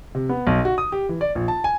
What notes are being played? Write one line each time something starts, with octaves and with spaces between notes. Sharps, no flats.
C3
B3
B1
F#4
D#6
G4
E3
D5
A#1
A5
G#5